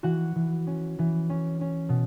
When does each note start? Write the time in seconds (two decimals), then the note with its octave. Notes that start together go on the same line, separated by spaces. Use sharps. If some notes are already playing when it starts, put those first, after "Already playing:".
0.03 E3 F#4 F#5
0.35 E3
0.67 C#4
0.99 E3
1.30 C#4
1.61 C#4
1.89 B2